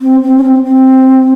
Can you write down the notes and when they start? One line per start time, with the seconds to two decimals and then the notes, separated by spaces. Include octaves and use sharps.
0.01 C4
0.23 C4
0.38 C#4
0.44 C4
0.65 C4